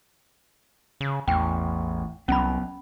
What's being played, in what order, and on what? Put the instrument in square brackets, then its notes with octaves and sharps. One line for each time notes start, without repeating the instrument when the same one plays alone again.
[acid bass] C#3
[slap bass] A1 [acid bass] E2 [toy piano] G5
[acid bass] C2 [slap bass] F#3 B3 [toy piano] C#4 B5